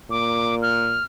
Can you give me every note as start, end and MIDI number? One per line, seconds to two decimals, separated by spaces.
0.10 1.00 46
0.10 0.55 86
0.62 1.04 89